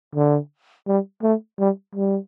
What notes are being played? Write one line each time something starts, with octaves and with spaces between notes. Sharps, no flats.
D3
G3
A3
G3
G3